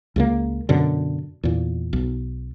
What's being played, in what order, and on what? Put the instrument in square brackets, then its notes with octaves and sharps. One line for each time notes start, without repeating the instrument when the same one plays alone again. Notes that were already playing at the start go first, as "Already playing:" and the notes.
[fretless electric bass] C#2 C#3 A#3
F#2 B2 D3
E2 A#2
B1